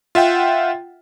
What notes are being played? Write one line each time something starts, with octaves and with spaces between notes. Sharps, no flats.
F4 E5 F#5 G5